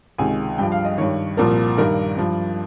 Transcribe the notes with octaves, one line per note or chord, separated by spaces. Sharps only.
C#2 C3 D#3 G#5
G2 F3 G5
F5
D#5
G2 D#3 C#5
C2 A#2 F3 A#4
G2 D#3 A#4
G2 F3